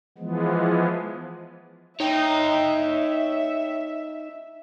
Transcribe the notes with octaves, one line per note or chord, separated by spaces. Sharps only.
E3 F3 G#3 B3
D#4 C#5 E5 G5